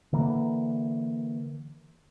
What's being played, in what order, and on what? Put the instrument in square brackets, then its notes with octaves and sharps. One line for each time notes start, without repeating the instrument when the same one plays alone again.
[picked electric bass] D3 E3 A#3